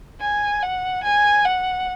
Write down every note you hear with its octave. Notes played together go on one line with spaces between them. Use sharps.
G#5
F#5
G#5
F#5